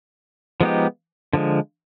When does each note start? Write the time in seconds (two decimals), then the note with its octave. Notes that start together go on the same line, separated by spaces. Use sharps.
0.61 F3 G#3 B3 D#4 G4
1.33 D3 F3 G#3